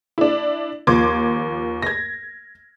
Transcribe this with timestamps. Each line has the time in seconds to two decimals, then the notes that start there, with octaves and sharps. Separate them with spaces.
0.18 D4 E4
0.87 D#2 F3 C6 D6 G#6
1.82 G#6 A#6